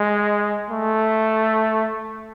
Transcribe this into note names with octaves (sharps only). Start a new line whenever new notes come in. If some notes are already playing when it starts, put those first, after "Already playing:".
Already playing: G#3
A3